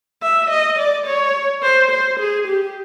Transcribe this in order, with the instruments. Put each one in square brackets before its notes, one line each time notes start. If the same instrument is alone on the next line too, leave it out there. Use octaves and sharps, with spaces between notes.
[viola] E5
D#5
D5
C#5
C5
C5
G#4
G4